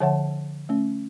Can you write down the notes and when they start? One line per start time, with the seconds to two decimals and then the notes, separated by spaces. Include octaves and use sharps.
0.01 D3 F3 C#5 E5 F#5 A5
0.69 A3 C#4